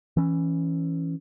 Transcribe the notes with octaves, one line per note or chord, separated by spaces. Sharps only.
E3 C#4